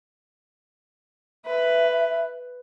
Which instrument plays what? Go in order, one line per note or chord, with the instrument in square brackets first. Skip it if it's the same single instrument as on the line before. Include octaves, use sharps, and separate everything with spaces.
[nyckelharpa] B4 [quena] E5